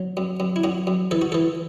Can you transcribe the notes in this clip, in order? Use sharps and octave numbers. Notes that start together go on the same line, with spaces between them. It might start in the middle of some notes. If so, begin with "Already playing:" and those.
Already playing: F#3
F#2
F#2
E4
F#2 F#4
F#2
E3 A4
F#4
E3 A4